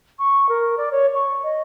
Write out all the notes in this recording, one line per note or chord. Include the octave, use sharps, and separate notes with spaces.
C#6
A#4
D5
C#5
C#6
D#5